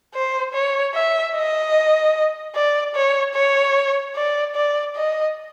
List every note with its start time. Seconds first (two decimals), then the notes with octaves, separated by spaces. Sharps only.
0.15 C5
0.54 C#5
0.94 E5
1.35 D#5
2.55 D5
2.95 C#5
3.34 C#5
4.16 D5
4.56 D5
4.96 D#5